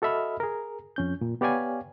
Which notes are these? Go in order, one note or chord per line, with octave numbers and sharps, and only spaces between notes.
F#4 A4 D#5 E5 B5 F6
G#4 A#4
F2 C#4 G6
A#2
B3 G4 C#5 D5 F5 G#5